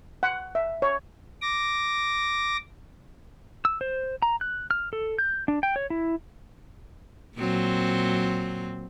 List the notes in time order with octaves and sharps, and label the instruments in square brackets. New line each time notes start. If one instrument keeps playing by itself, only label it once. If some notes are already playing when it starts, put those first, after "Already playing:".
[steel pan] F#5
E5
C#5
[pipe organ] D6 A#6
[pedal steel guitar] E6
C5
A#5
F#6
F6
A4
G6
D4
G5
C#5
E4
[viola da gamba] A#2 F#3 C4